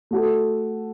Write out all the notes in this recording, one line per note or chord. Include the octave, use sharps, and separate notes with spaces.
A3 F#4 A4